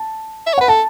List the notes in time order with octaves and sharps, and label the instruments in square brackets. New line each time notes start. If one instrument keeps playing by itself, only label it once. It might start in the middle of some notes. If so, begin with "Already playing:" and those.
Already playing: [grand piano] A5
[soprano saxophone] E5
C#5
[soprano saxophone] B4 [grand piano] F#5
[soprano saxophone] A4 [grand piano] A5